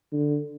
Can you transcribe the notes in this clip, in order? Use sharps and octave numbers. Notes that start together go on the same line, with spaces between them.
D3